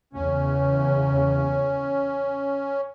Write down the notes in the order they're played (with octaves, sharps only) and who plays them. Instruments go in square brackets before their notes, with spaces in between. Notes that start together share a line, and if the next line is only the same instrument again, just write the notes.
[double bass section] E2 C#3 [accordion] C#4